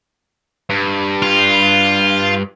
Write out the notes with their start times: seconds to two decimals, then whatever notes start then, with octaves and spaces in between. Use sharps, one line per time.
0.70 G2
1.22 F4